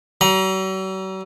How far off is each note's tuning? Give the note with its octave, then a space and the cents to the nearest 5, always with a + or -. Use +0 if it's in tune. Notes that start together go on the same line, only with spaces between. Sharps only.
F#3 +45 A#5 +30